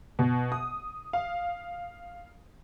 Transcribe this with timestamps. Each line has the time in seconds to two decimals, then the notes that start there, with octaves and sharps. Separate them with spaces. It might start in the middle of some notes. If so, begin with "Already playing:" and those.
0.19 B2
0.52 D#6
1.13 F5